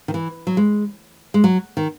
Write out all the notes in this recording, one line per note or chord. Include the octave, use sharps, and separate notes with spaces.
D#3
E3
F#3
G#3
G#3
F#3
D#3